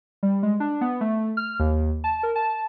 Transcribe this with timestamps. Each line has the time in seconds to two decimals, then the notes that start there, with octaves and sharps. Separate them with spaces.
0.23 G3
0.43 G#3
0.60 D4
0.81 B3
1.01 A3
1.37 F6
1.59 D#2
2.04 A5
2.23 A#4
2.36 A5